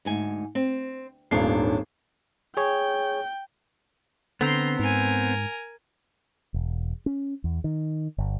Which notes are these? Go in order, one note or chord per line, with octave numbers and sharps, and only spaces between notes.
D2 G#2 G#5
C4
D#1 G#1 D4 F4 C#5 C7
G#4 C#5 G5
D3 B3 C4 A#5 C6
G#2 A#4 G#5
E1
C#4
E2
D#3
G1